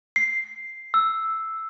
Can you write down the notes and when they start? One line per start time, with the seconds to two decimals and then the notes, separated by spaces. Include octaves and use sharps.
0.16 C7
0.94 E6